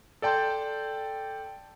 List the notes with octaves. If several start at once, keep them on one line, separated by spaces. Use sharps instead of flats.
A4 D5 G5 A5 C6 G6